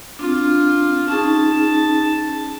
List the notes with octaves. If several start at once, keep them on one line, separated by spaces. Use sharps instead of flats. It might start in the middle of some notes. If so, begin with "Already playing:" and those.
C4 D4 F4
C#4 D#4 G#4 A5